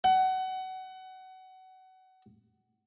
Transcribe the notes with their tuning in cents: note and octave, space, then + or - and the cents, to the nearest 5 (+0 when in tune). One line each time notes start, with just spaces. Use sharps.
F#5 +25